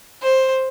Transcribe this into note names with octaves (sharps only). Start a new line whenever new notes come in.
C5